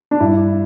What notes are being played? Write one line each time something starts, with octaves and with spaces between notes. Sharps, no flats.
D4
G2 E4